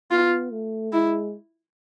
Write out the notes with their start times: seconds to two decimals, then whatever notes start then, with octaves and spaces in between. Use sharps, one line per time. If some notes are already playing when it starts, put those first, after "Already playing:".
0.11 B3 F4
0.52 A3
0.92 G#3 E4